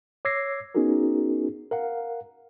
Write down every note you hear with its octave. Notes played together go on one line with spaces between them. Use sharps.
C#5 D6 E6 G#6 A#6 C7
B3 C#4 D#4 F#4 G#4 A#4
A#4 F5 F#5